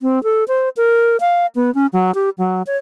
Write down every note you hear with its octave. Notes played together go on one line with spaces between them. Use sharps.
C4
A4
C5
A#4
F5
B3
C#4
F#3
G4
F#3
C#5